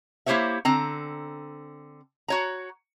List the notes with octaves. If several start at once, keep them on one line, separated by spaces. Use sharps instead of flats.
A#3 E4 G4 C5 C#5 E5
D3 C4 A#5
F#4 C#5 A#5